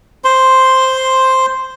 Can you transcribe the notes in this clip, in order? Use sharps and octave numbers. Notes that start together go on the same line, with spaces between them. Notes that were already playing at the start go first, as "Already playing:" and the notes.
C5 C6